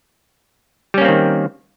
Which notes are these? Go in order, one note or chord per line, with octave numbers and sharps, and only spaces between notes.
D#3 G3 A#3 C4 C#4